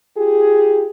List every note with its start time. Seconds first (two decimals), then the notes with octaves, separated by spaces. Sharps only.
0.16 F4 G4 G#4